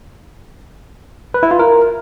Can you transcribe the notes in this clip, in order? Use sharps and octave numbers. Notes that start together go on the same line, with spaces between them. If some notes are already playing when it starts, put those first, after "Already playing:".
B4
E4
F4
A#4